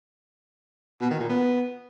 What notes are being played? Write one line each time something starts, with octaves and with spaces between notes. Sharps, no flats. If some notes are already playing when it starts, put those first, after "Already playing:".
B2
D#3
A#2
B3